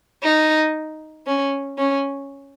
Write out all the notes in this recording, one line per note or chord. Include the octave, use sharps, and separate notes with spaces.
D#4
C#4
C#4